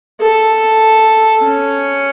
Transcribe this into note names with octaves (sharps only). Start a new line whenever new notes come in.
A4
C#4